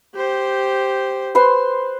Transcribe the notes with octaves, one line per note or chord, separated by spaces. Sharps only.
G4 C5
B4 C5 C6